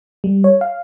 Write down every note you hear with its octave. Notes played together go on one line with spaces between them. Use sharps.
G3
C#5
F5